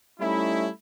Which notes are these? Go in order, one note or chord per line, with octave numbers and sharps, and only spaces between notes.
G3 A3 C#4 D#4 E4